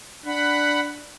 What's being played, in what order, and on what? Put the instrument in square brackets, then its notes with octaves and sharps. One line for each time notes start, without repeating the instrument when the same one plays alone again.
[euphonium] D4 [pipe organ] F#5 B5